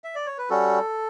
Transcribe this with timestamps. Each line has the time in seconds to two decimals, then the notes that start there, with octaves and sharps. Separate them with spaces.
0.04 E5
0.15 D5
0.26 C#5
0.38 B4
0.50 G3 C#4 F#4 A4